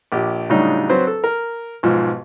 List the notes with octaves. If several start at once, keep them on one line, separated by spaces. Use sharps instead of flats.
A#1 G4
A2 C#3 F#3 G3 D4 D#4
F#3 C4 B4 C5
A4
A#4
B1 G#2 F3